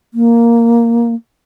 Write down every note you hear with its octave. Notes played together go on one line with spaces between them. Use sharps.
A#3